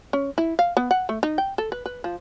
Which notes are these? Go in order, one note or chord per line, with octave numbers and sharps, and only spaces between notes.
C#4
E4
F5
B3
F#5
A3
D#4
G5
A4
B4
B4
F3